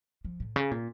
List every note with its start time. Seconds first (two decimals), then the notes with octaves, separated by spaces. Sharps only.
0.25 F3
0.40 A2
0.56 C#3
0.71 A#2